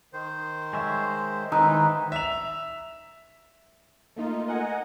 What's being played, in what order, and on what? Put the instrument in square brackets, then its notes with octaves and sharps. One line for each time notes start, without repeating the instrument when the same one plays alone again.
[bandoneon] D#3 C5
[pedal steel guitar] G#3 C#5 E5
[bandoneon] G#2 E3 B4 [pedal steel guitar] D#3 G#3 E6 [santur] D#4
[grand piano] E5 F7
[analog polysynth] A3 A#3 D#4 F4
A#4 D#5 F#5 G#5